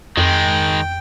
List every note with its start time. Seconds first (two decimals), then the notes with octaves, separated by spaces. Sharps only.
0.17 F2 D#3 G#3 G5